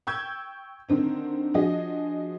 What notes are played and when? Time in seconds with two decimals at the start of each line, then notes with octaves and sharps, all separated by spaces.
0.07 G5 C#6 E6 G6 G#6
0.89 D3 D#3 C4 D4
1.54 F3 D4 F#4 G#4 D#5